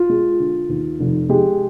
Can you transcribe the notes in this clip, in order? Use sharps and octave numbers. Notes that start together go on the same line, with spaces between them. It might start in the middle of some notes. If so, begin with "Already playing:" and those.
Already playing: F4
G#3
D3
D#2
F1
G#3 G4